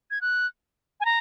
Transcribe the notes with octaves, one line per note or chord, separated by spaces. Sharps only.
G#6
F#6
G#5
A#5